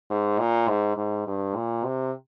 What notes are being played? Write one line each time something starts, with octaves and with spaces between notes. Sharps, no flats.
G#2
A#2
G#2
G#2
G2
A#2
C3